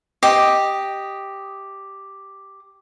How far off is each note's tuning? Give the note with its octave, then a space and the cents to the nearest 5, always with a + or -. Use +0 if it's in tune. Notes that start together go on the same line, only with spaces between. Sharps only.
G4 +0 D#5 +0